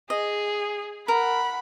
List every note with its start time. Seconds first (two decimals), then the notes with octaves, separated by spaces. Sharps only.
0.10 G#4 D#5
1.08 A#4 F#5 B5